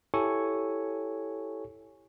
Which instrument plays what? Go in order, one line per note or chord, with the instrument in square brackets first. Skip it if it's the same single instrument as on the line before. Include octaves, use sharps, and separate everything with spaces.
[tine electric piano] E4 G4 A4 C#5 G#5 C#6